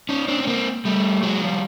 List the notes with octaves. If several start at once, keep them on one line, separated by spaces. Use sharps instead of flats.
C#4 D#4
C4 D4
C#4
A#3 C4
G3 A3
F#3 G#3
F3 G3